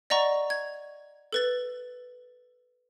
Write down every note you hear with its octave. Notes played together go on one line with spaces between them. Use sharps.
D5 D#5 F#5 A#5 C#6
G#6
A4 B4 A6